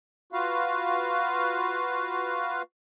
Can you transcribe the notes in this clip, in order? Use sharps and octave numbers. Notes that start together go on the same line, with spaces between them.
F4 F#4 B4 F5